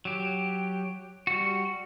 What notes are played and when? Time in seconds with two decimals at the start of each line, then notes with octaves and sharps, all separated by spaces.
0.05 F#3 G4
1.27 G3 F#4